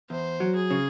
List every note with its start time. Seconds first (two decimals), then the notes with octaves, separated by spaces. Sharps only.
0.10 E2 C5
0.40 F#3
0.55 G#4
0.71 C#3